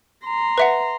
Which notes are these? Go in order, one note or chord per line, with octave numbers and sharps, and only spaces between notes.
A#5 C6
B4 E5 F#5